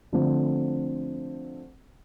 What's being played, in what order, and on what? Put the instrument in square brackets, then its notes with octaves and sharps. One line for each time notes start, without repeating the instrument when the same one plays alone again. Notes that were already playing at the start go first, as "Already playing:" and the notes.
[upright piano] D3 F3 A3 C4